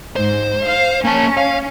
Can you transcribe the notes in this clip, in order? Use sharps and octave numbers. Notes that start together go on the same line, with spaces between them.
G#2 C5
F5
A#3 C#4 A5
F5